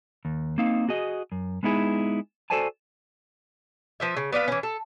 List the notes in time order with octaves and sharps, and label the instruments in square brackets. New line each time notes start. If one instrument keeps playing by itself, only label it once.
[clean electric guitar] D#2
A#3 C4 D#4 F5
F#4 G#4 D#5
F#2
G#3 B3 D#4 E4 G#4
F#4 A4 C5 D5 G#5 A5
[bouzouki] F3 B4 E5
C#3
B3 D4 B4 F5
E3 C#4
A4